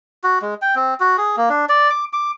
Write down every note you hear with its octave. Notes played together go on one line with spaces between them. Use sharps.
F#4
G#3
G5
C4
F#4
G#4
A#3
D4
D5
D6
D6